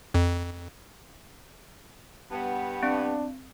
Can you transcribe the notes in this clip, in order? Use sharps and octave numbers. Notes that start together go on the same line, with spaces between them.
F2
G2 B3
C4 D4